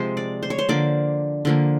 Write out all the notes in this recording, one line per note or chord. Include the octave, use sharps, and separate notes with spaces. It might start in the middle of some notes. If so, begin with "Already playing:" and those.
Already playing: C3 F3 G#3 C5
D5
C5
C#5
C5
D3 F3 A#3 D5
D3 F3 A#3